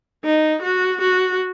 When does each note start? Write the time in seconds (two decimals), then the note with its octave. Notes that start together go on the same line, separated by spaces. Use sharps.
0.24 D#4
0.62 F#4
1.01 F#4